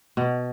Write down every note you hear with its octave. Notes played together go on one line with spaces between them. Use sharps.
B2